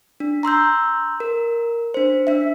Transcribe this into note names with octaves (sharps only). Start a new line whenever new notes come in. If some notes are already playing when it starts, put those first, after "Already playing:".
D4
A#5 C6 E6 G6
A#4
D4 C5
D4 E5